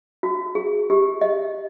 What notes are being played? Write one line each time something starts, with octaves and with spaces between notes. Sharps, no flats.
F#4
G#4
G4
D#5